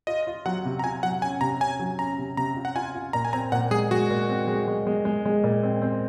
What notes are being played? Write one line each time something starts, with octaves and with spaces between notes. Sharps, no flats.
F4 D#5
F4
F#3 F#5
C3
A#5
F4 G#5
F#3 F#5
C#4 G#5
C3 A#5
C#4 G#5
F#3
C#4 A#5
C3
C3 A#5
F4
F#5
F4 G#5
F4
A#2 A#5
G#5
C4 A#5
A#2 F#5
G#3 G#4
G#3 F#4
A#2
C4
G#3
G#3
G#3
G#3
G#3
A#2
C4
C4